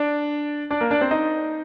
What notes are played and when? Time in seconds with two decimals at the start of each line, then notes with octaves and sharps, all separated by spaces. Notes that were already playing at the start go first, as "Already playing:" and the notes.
Already playing: D4 D5
0.71 D4 D5
0.81 A#3 A#4
0.91 D4 D5
1.01 C4 C5
1.11 D#4 D#5